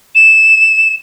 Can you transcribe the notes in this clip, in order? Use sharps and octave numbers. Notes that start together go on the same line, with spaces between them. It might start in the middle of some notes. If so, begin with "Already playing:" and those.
E7